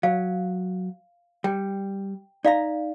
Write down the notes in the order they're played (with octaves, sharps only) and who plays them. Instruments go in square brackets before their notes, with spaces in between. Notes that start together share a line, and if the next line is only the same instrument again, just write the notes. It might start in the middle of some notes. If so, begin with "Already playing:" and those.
[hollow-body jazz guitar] F#3 [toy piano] F5
[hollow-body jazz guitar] G3 [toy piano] G5
[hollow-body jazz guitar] D#4 A#5 [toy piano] D5 F5